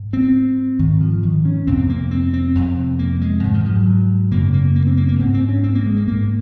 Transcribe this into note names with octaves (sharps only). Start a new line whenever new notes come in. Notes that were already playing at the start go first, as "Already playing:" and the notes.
Already playing: G#2
C4
G#2 D#3
F3
D#3
C#4
F2 C3 C4
A#3
C4
C4
F2 C3
A#3
G#3
G#2
D#3
F3
F#3
F#2 C#3 A#3
A#3
A#3
C4
A#3
A#3
G#2 C4
C4
C#4
C4
A#3
G#3
A#3
G#2 A#3